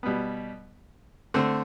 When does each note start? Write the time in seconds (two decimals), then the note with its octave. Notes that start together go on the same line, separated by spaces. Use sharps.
0.03 B2 G3 B3
1.34 D3 A3 C4